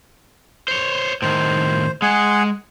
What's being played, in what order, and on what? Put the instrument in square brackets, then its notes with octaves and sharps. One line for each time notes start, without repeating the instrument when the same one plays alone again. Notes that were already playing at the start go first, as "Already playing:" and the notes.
[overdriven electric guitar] C5 C#5
[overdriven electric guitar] A2 D#3 [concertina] C5
[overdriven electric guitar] G#3 [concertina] G#4 F#5